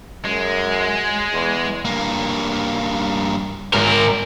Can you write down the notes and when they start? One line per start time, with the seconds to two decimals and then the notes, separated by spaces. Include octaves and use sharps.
0.25 F#2 G#3
1.33 E2
1.85 G2 A#3
3.74 G#2 A#4